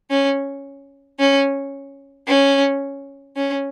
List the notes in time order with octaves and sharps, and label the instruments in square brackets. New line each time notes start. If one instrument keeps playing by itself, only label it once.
[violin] C#4
C#4
C#4
C#4